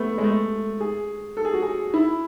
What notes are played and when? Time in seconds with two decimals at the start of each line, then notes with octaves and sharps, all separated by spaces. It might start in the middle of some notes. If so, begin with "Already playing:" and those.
Already playing: A3 B3
0.18 G#3
0.23 A3
0.80 G#4
1.37 A4
1.45 G#4
1.53 F#4
1.62 G#4
1.94 E4